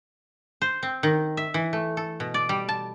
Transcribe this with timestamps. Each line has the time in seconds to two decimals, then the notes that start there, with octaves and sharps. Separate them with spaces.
0.62 C5
0.83 C4
1.03 D#3
1.37 E5
1.54 E3
1.73 A3
1.97 A4
2.20 B2
2.34 D5
2.49 G3
2.69 A5